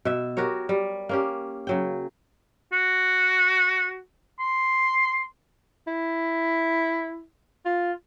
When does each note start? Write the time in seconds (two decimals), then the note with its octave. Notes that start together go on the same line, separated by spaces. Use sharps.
0.05 B2 E5
0.37 F#4 G4 A#4 C#5
0.69 G3
1.09 A#3 C#4 G4
1.67 C#3 F#3 G5
2.72 F#4
4.39 C6
5.87 E4
7.66 F4